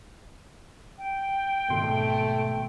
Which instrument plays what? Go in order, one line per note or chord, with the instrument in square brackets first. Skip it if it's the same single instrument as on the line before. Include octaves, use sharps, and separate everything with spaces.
[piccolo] G5
[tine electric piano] G#1 B2 C6 [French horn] A3